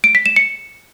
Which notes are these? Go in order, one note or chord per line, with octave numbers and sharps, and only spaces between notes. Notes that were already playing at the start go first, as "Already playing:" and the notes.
D7
B6
E7
C#7